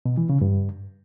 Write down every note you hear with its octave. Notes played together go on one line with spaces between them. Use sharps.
B2
E3
C#3
G2